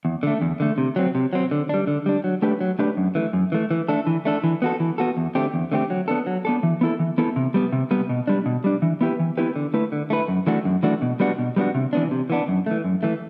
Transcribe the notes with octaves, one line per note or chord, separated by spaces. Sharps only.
E2
D3 A3
E2
D3 A3
C3
F#3 C4
C3
F#3 C4
D3
G3 D4
D3
G3 D4
F#3
A3 D4 G4 B4
F#3
A3 D4 G4 B4
F#2
E3 A3
F#2
E3 A3
E3
A3 D4 A4
E3
A3 D4 A4
E3
B3 F#4 A4
E3
B3 F#4 A4
E2
D3 A3 C4 G4
E2
D3 A3 C4 G4
F#3
B3 D4 A4
F#3
B3 D4 A4
E3
B3 E4 A4
E3
B3 E4 A4
C3
G3 B3
C3
G3 B3
B2
G3 D4
B2
G3 D4
E3
B3 E4 G4 B4
E3
B3 E4 G4 B4
D3
A3 E4 B4
D3
A3 E4 B4
F#2
E3 A3 D4 F#4
F#2
E3 A3 D4 F#4
B2
G3 B3 D4 F#4
B2
G3 B3 D4 F#4
C3
E3 B3 D4
C3
E3 B3 D4
F#2
E3 A3
F#2
E3 A3